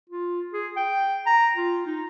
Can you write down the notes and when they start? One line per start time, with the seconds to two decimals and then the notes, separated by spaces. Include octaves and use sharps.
0.10 F4
0.53 G#4
0.77 G5
1.26 A#5
1.56 F4
1.86 D#4